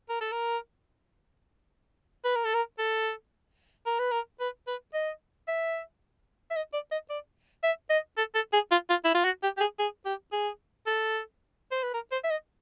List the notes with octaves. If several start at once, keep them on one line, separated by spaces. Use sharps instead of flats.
A#4
A4
A#4
B4
A#4
A4
A#4
A4
A#4
B4
A#4
B4
B4
D#5
E5
E5
D#5
D5
D#5
D5
E5
D#5
A4
A4
G#4
F4
F4
E4
F4
F#4
G4
G4
G#4
G#4
G4
G#4
A4
C5
B4
A#4
C5
E5
D#5